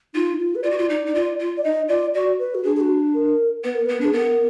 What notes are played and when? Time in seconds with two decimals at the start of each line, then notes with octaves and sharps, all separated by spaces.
0.14 D#4 F4
0.39 F4
0.55 B4
0.64 F4 D5
0.71 F#4
0.78 F4
0.90 D#4
1.06 D#4
1.15 F4
1.39 F4
1.57 D5
1.64 D#4 D#5
1.88 F4 D5
2.14 F#4 D5
2.39 B4
2.55 F#4
2.64 D4 G#4
2.76 G#4
2.80 F#4
3.14 A#4
3.64 B3 B4
3.75 A#4
3.86 B3 B4
4.01 D4 G#4
4.13 B3 A#4